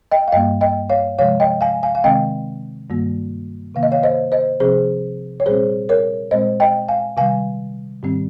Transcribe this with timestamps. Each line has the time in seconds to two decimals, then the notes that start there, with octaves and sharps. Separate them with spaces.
0.12 D#5 G5
0.28 F5
0.32 G2 G3 A#3 D#5 G5
0.61 D#5 G5
0.90 C#5 F5
1.19 C3 F3 G#3 C#5 F5
1.40 D#5 G5
1.61 F5 G#5
1.83 F5 G#5
1.95 F5
2.04 C3 D#3 G#3 C4 D#5 G5
2.90 G2 D#3 G3 A#3
3.75 C3 D#3 A#3 F5
3.83 D#5
3.92 C#5 F5
4.03 C5 D#5
4.32 C5 D#5
4.60 C3 F3 C4 G#4 C5
5.40 C#5
5.46 A#2 G3 C4 G#4 C5
5.89 A#4 C#5
6.31 A#2 G#3 C4 C5 D#5
6.60 D#5 G5
6.89 F5 G#5
7.17 C3 D#3 G3 F5 G#5
8.03 G#2 D#3 G3 C4